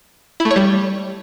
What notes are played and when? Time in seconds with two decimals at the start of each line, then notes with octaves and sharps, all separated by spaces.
0.40 E4
0.45 A3
0.51 C#5
0.56 G3